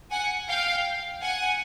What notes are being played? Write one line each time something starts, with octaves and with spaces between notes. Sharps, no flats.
F#5 G#5
F5 G5
F#5 G#5